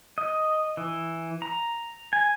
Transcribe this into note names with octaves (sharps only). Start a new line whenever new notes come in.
D#5
E3
A#5
G#5